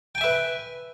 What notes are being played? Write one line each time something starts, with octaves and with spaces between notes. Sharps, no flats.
B4 E5 G5 G#5